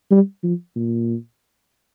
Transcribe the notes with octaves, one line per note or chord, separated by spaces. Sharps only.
G3
F3
A#2